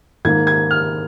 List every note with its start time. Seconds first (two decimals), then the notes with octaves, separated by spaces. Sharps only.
0.25 G#2 D#3 A#3 G#6
0.47 G#6
0.71 F6